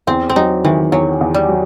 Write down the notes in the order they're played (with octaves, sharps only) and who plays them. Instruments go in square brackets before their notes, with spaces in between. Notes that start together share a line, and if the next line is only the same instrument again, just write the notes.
[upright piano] E2 [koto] C4
[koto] C4
[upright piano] F#3 [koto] D#4
[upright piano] D#3 [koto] E3
[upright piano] E2 [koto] F#3
[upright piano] E2
[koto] G3
[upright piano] F#3